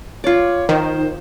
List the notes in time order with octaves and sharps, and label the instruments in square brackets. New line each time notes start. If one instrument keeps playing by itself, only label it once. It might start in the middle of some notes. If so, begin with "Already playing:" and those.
[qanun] F4 D5 [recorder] C#5
[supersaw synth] D#3 [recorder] C5